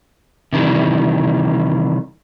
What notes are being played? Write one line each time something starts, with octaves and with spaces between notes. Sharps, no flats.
C3 D#3 E3 G3